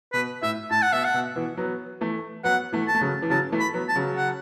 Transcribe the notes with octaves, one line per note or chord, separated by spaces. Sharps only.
B2 B4
A2 E5
A2 A5
F#5
B2 E5
F#5
B2
B2 E3
F#3 B3
E3 A3
F#3 B3 F#5
E3 A3
A5
A3
C#3 F#3
E3
C#3 F#3 A5
E3 A3
B5
F#3 B3
A5
C#3 F#3
F#5